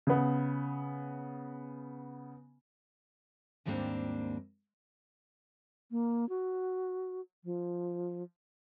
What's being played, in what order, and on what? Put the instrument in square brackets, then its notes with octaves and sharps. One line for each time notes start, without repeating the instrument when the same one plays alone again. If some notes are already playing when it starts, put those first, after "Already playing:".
[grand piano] C#3 B3
[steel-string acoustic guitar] D#2 G#2 G3 A#3 C4 D4
[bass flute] A#3
F#4
F3